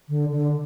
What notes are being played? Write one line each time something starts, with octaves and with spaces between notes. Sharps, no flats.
D3
D3